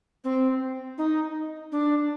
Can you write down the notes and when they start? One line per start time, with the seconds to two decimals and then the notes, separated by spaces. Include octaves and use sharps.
0.24 C4
0.98 D#4
1.72 D4